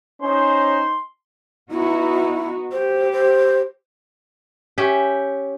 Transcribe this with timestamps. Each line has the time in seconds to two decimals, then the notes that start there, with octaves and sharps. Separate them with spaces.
0.22 C#4 D#4 C5 C6
1.71 B3 D#4 E4 F#4
2.72 G4 C5
3.13 C5
4.78 C#4 G4 E5